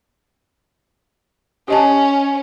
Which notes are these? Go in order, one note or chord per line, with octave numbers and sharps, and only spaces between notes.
C#4 G4 D#5 A5